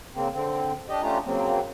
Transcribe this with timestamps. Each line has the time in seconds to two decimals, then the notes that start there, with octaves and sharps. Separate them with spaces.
0.15 C#3 A#3 C4
0.34 D3 C4
0.89 D4 G4 D#5
1.03 A3 C#4 D4 F4 G4 A#5
1.26 C#3 F#3 A#3 C4